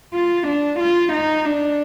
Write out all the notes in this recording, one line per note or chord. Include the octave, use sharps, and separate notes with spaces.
F4
D4
F4
D#4
D4